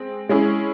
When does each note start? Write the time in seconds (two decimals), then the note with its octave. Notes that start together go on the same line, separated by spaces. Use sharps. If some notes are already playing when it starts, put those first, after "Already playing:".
Already playing: G#3 C4
0.29 G#3 C#4 E4 G#4